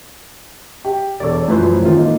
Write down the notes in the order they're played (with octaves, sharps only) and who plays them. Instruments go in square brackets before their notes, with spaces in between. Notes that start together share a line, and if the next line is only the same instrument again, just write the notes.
[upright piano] G4
[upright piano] E1 A4 [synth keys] C#5 D5
[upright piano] F#2 E3 F3 [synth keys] A3 B4 C5
[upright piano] A1 F4 [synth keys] D#3 G#3 C4
[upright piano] A#3 D#4 A4